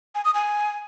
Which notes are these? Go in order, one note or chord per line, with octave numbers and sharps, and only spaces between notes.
G#5
D#6
G#5